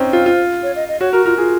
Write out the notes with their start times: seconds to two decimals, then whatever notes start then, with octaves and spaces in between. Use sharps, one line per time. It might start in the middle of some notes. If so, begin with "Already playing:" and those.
Already playing: C4 C#4 D#4 C5
0.13 F4
0.26 F4
0.63 C#5
0.76 D#5
0.88 D#5
1.01 F#4 C#5
1.13 F#4 A#4
1.26 F4 A#4
1.38 F4 G#4